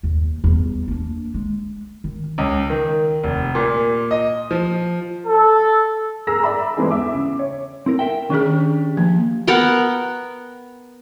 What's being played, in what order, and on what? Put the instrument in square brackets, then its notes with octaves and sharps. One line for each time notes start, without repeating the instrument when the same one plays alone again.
[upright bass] D#2
E2 G3
A#3 D4
G#3
D#3
[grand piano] C#2
D#3
F1
A#2
D#5
F3
[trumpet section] A4
[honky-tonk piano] G#4 A#4 A#5 E6 A#6
D5 E5 B5
E3 G#3 A3 C4 D#4 G#4
E2 E5 D6
C#3
C#5
[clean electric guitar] C4 E4 A#4
A#4 E5 G5
[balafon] D#3 G#4 [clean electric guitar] C#4 D4 G4
[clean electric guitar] F3 [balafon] A#3
[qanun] B3 A#4 F#5 G5